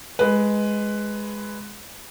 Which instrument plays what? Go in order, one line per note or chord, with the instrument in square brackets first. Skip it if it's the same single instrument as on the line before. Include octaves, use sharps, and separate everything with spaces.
[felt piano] G#3 B4